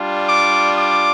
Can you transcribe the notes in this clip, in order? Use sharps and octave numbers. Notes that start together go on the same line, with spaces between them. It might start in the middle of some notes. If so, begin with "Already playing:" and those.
Already playing: G3 D4 F4
D6
D6